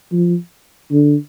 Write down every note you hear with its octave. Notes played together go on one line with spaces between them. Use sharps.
F3
D3